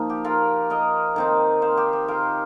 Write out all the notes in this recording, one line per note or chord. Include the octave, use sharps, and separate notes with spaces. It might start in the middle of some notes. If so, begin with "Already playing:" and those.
Already playing: F3 A#3 D#4
G4
F4 A#4
A#4 D#5
D#3 C4 D#4
C5 F5
G4
G4
F4 A#4